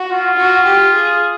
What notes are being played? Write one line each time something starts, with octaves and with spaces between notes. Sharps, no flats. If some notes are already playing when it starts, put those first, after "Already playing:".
Already playing: F#4
F4
F#4
G4
G#4